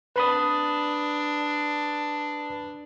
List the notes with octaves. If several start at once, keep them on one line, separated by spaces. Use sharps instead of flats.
D4 B4 B5 D#6